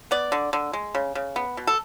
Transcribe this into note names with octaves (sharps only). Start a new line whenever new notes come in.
B3 D5
D3
D3
G#3
C#3
C#3
B3
B2
A4